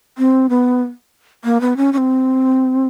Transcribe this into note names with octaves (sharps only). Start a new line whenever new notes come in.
C4
B3
A#3
B3
C#4
C#4
C4